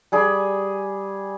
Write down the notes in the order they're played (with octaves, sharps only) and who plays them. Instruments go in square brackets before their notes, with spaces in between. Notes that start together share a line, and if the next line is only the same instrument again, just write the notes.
[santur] G3 G#4 B5